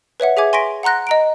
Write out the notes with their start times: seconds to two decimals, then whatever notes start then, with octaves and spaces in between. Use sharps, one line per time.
0.20 B4 C#5 E5 F#5
0.37 G#4 E5 G#5 D6 G#6
0.53 G#5 C6 C#6 A#6 B6 D7
0.83 F#5 A#5 C6 F#6 A#6
1.07 D#5 A#5 D7